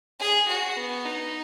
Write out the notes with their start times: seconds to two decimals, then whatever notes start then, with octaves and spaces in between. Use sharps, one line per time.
0.20 G#4
0.48 F#4
0.77 B3
1.06 D#4